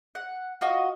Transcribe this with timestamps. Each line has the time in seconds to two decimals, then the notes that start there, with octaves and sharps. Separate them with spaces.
0.15 F#5
0.61 F4 F#4 D#5